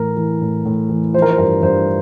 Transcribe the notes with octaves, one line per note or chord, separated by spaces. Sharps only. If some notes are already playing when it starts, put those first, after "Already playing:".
Already playing: A2 E3 A#4
E3
A2
A2
E3
F3 C5
A#4
C5
G2 A#4
G2 C5